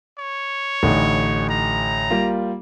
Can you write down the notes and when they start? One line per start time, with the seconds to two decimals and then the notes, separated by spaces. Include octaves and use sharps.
0.18 C#5
0.83 A1 D3 D#4
1.49 A#5
2.10 G3 A#3 F4